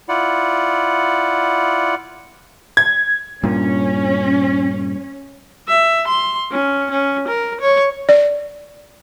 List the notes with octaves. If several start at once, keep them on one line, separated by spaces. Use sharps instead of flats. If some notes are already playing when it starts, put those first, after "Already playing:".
E4 F4 D5 F#5
G#6
G2 A#2 C#4
E5
C6
C#4
C#4
A#4
C#5
D5